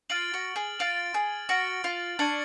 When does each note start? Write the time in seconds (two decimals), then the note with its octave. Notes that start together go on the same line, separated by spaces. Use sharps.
0.10 F4 F6 A6 D7 F#7
0.34 F#4
0.56 G#4
0.79 F4 F6 A6 D7 F#7
1.14 G#4
1.49 F#4 F6 A6 D7 F#7
1.84 F4
2.19 D4 C#6 G#6 C#7 F#7